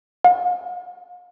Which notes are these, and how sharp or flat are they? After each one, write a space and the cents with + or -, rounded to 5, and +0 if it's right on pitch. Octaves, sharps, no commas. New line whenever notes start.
F5 +40